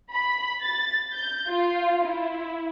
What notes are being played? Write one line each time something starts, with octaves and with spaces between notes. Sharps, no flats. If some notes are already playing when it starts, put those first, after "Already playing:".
B5
A6
G6
F4
E4